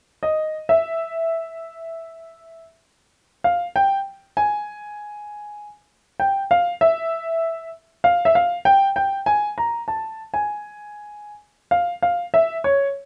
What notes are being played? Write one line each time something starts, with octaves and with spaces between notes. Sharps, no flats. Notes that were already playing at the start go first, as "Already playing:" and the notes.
D#5
E5
F5
G5
G#5
G5
F5
E5
F5
E5
F5
G5
G5
G#5
A#5
A5
G#5
F5
F5
E5
C#5